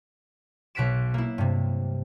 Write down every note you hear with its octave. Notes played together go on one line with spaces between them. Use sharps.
B1 B2 F#6 B6 D7 E7
A#3 E4
G2 C3